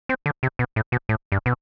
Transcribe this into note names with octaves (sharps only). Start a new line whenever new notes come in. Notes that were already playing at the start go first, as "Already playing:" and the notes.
C4
D3
C3
B2
A2
B2
A2
G2
B2